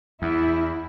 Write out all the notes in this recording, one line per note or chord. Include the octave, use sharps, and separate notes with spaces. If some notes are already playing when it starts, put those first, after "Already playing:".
E2 E4